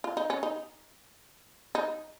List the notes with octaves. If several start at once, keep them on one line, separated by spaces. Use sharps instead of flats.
F4
D#4
C#4
D#4
D#4